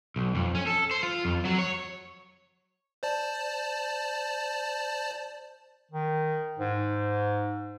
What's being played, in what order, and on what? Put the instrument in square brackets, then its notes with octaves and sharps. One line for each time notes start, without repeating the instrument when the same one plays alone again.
[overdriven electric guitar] B1
F2
C#4
A4
C5
F4
F2
F#3
C#5
[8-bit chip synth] C5 D5 A5
[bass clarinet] D#3
G#2